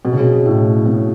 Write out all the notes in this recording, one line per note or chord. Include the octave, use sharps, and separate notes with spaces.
B2
C#3
B2
A2
B2